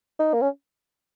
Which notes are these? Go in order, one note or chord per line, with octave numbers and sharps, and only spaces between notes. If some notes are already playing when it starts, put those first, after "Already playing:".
D#4
A#3
C#4